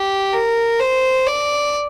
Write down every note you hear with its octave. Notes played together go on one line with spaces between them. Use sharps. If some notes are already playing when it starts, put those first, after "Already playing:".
Already playing: G4
A#4
C5
D5